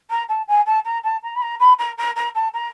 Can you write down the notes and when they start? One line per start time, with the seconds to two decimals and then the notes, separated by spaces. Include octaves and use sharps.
0.10 A#5
0.29 A5
0.48 G#5
0.66 A5
0.85 A#5
1.04 A5
1.23 A#5
1.36 B5
1.42 A#5
1.60 B5
1.79 A#5
1.98 A#5
2.16 A#5
2.35 A5
2.54 A#5